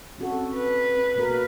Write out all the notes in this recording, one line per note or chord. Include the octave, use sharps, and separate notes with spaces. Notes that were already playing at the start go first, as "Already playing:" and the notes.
C4 C#4 F#4 A4
B4
B2 A#3 F#4 A#4